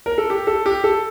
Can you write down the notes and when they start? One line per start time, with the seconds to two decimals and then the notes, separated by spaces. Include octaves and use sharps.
0.06 A#4
0.18 A4
0.30 G4
0.47 A4
0.66 G4
0.84 A4